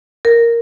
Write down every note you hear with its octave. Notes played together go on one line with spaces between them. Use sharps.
A#4